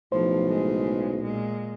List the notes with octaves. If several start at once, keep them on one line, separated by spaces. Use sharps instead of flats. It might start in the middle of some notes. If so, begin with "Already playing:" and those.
B1 A2 F3 C5
C#3 G#3
A#2 G#3